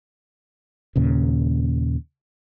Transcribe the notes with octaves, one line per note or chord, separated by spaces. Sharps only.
D#2 A#2 C#3